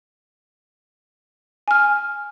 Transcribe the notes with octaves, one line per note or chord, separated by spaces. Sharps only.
G#5 F6